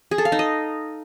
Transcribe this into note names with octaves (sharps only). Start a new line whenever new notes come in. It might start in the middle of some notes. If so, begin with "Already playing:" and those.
G#4
A4
F5
D#4
D#5